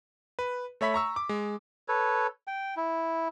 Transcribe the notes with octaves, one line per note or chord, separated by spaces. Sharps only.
B4
A3 C#5 E5 B5 B6
A#5 C#6 E6
D6
G#3
A4 B4 C#5
G5
E4